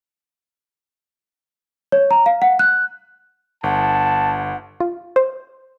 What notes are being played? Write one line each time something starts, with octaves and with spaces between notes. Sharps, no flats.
C#5
A#5
F5
F#5
F#6
G1 F#5 A5
F4
C5